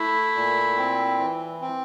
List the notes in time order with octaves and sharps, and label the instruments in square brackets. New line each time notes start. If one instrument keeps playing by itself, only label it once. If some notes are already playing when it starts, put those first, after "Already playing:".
Already playing: [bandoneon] A3 [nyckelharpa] E4
[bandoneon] A#2
C4
E3
C4